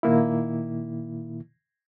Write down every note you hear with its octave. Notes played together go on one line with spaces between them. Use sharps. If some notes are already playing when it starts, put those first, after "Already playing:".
A#2 D#3 A#3 E4